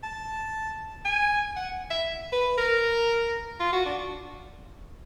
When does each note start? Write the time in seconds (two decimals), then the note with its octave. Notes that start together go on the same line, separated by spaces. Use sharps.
0.03 A5
1.05 G#5
1.56 F#5
1.91 E5
2.33 B4
2.58 A#4
3.60 F4
3.73 F#4
3.86 D4